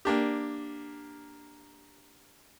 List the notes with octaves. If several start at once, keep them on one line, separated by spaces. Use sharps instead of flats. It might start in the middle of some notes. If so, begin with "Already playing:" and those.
A#3 D4 G4